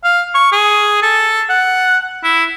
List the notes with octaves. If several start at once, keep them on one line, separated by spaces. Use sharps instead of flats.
F5
C#6
G#4
A4
F#5
E4